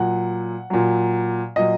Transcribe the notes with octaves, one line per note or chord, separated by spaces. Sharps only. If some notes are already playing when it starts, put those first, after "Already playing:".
Already playing: A#2 F#3 F#5
A#2 F#3
A#2 F#3 D#5